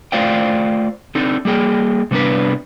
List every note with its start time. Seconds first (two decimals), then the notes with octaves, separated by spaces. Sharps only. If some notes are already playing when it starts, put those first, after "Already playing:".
0.12 A3 F4 C5 D5 F5 G5
1.15 C4 D4 D#4 A4
1.45 G3 A#3 G#4 G5
2.11 C3 G3 B3 D4 B4